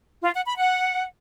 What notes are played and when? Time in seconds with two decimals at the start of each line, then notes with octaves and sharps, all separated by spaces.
0.22 F4
0.34 F#5
0.45 B5
0.57 F#5